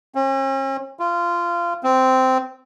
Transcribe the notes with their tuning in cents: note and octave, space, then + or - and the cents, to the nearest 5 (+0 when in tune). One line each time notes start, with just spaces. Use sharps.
C#4 -45
F4 -20
C4 -10